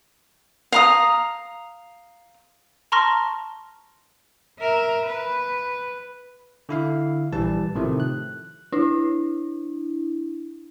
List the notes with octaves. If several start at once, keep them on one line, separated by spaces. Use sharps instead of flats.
F5 A#5 D#6
A5 A#5 C6 C#6 F6 A#6
A#4 E5
B4
D3 E4 F5
A#1 E3 G3 A5
A2 C3 D#3 F3 A3
F#6
D4 E4